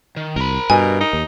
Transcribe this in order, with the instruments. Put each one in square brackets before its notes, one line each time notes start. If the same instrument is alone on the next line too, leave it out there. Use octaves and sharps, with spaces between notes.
[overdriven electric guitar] D#3
[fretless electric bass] C2 [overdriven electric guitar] A#4 B5
[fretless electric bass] G2 [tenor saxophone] B2 [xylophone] G#5
[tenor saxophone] D#4
[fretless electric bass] D#2